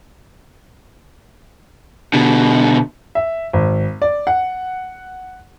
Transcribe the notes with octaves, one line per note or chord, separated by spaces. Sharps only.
B2 D3
E5
G#1
D5
F#5